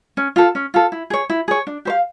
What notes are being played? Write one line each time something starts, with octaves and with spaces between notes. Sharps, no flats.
C#4
F4 A4
C#4
F4 A4
E4
G#4 C#5
E4
G#4 C#5
D4
G4 C5 F5